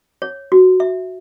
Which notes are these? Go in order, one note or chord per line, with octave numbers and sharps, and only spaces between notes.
C#5
F#4
E5